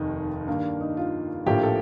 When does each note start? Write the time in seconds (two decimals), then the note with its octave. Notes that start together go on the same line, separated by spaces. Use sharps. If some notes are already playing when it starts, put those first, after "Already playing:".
Already playing: F1 D#2 D#3 D#4
0.48 G2 D#3 A#3 D4
0.81 D#4
0.97 F4
1.46 A#1 A2 F3 A#3 G4
1.63 A4